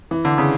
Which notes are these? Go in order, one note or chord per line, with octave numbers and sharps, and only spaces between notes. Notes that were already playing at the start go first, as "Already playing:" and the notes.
E3
D3
C#3